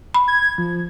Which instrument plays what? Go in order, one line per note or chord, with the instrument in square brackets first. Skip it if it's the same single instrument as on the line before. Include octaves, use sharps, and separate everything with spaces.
[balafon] B5
[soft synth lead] G#6
F3